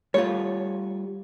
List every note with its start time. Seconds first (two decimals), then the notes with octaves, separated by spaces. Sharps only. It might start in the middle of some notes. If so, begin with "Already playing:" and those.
0.14 G3 A3 F4 C#5